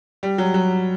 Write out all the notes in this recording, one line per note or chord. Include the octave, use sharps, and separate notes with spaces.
G3
F#3
F#3